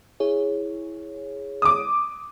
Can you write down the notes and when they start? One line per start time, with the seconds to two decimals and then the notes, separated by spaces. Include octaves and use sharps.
0.20 E4 G#4 C#5
1.62 D6 D#6